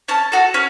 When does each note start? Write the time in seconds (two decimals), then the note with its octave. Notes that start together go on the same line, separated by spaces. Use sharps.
0.08 C#4 A5
0.32 F#4 A4
0.54 C#4